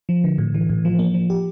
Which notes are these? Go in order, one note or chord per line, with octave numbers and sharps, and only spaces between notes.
F3
D3
A2
E3
A2
F3
A#3
F3
G4